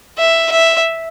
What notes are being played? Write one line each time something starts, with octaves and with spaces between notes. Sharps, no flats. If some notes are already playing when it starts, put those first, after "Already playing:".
E5
E5